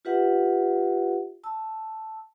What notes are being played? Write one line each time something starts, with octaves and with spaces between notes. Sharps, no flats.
F4 G4 B4 E5 F#5
A5 E6